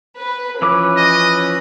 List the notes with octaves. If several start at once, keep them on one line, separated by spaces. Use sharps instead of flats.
B4
E3 F3 C#4 B4 D6
D#5